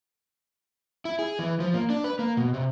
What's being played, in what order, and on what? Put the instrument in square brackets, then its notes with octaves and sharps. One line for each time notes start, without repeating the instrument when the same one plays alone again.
[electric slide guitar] E4
G#4
E3
F3
A#3
D4
B4
A#3
B2
C3